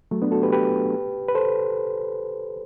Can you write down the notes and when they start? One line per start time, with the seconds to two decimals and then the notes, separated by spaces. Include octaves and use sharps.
0.11 F#3 A3
0.22 B3 D4
0.32 F#4 A4
0.42 G4 B4
0.53 G4 B4
1.28 B4
1.35 A4 C5